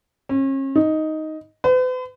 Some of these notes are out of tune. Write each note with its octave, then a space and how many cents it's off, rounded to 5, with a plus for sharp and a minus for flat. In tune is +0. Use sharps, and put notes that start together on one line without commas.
C#4 -40
D#4 +5
B4 +45